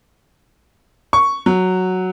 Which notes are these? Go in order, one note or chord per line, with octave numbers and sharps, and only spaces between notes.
C#6
F#3